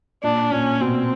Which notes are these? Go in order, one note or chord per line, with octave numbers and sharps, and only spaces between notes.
A#2 D4
A#2 C#4
B2 C4